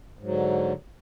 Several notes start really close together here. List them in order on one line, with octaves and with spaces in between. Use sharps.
G#2 F#3 D3